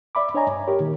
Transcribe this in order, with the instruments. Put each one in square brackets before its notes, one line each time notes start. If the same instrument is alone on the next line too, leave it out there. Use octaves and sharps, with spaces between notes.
[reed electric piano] D5 E5 B5 D6
D4 C#5 D#5 G#5 A#5
G2
G4 A#4 C#5
A#2 D#3